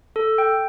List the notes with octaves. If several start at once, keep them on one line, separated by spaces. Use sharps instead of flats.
A4
G5